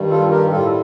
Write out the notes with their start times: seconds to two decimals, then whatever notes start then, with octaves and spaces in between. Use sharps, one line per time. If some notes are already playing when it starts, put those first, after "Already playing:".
Already playing: G2 D#3 G3
0.10 F4 A4
0.31 G4 A#4
0.51 A2 G3 F4 A4